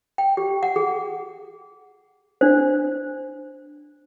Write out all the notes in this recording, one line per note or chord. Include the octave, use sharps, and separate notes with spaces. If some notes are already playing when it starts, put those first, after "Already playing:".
G5
G4
F#5
G#4
D4 C5